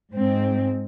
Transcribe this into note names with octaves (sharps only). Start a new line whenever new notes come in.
G#2 G#3 C4